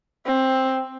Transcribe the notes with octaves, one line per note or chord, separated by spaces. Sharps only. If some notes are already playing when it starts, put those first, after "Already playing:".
C4